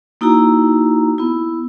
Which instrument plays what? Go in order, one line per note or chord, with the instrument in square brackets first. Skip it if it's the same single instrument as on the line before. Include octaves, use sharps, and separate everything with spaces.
[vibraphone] A#3 D#4 E4 F#4 A#5
B3 E4